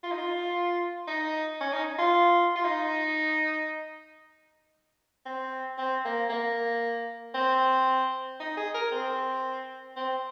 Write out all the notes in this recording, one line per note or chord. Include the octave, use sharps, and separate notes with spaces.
F4
D#4
F4
D#4
C#4
D#4
F4
F4
D#4
C4
C4
A#3
A#3
C4
D#4
G#4
A#4
C4
C4